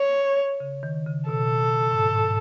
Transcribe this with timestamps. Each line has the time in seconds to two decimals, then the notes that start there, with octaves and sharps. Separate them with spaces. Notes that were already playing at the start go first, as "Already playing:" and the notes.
Already playing: C#5
0.60 C#3
0.83 D#3
1.06 C#3
1.29 B2 A4
1.91 G#2
1.97 A2
2.15 G#2